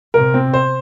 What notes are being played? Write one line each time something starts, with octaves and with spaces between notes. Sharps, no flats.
C3 A#4
C4
C5